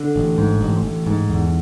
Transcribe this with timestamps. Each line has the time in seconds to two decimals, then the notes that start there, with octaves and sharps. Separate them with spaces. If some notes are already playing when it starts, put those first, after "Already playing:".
Already playing: D3
0.16 A1
0.38 G#2
0.61 A1
0.84 A1
1.07 G#2
1.29 E2